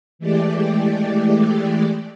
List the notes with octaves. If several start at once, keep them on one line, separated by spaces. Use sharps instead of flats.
E3 G#3 A3 G4 D5